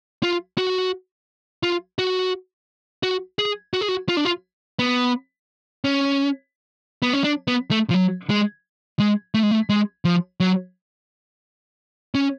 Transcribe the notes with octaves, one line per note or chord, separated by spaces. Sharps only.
F4
F#4
F4
F#4
F#4
G#4
F#4
G#4
F#4
F4
D4
F4
B3
C#4
B3
C#4
D4
B3
A3
F3
F#3
G#3
G#3
A3
G#3
A3
G#3
F3
F#3
C#4